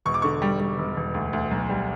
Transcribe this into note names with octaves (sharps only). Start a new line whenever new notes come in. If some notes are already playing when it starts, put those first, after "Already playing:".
E1 C#6
D6
D3 C#6
G3
G3
E1
E1
D2
D2
B1
G3